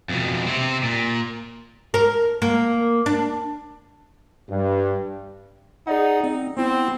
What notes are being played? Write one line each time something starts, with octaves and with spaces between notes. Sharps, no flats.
F2 B2
C3 C4
A#2
A#4
A#3
D4
G2
D#4 G#4 D5 F#5
C4
B3 C4 E4